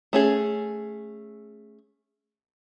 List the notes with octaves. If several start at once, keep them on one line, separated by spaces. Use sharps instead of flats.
A3 C#4 G#4